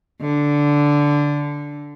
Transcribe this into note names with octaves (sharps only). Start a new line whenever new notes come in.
D3